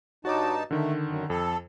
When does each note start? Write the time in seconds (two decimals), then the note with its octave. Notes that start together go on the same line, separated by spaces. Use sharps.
0.25 G2 D#4 F#4 C#5 A5 D6
0.71 D3 D#3 A3
1.06 F#2
1.30 F2 A4